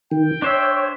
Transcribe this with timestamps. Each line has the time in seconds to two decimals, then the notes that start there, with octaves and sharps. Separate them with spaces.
0.11 D#3 G5
0.42 D4 C5 C#5 E5